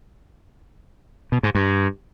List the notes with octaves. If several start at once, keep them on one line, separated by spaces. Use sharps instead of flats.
B2
G#2
G2